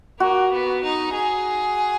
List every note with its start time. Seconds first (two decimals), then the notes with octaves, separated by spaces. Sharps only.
0.20 A#3 F#4
0.52 B3
0.83 D#4
1.14 G#4